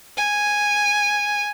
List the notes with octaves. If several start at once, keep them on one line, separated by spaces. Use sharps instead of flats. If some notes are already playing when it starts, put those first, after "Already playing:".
G#5